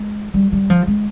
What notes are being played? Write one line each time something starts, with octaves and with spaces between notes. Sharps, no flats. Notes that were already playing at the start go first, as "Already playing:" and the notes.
Already playing: G#3
G3
G3
F3
G#3